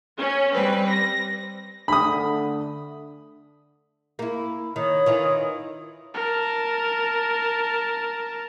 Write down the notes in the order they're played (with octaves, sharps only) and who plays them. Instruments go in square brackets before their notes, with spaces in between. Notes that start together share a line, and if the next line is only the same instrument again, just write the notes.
[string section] C#4
G3 C4 B4
A#6
[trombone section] D3 A3 [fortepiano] B5 D#6
[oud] A#3 E4
[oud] D#3 [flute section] C#5 B5 D#6
[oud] D#3 E3 F4
[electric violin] A#4 A5